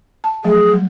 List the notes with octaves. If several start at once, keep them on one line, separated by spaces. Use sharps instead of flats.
A5
F3 F#3 A3 G#4
F#3 G3